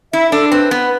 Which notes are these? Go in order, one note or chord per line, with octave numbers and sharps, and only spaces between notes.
E4 E5
D4 A4
C4 B4
B3